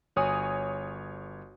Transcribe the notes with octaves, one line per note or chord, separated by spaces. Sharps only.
G1 F#4 C#5 G#5 D#6